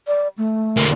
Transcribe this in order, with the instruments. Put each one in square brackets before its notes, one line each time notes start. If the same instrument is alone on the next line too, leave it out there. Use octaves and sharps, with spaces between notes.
[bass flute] D5
A3
[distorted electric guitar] D3 A#3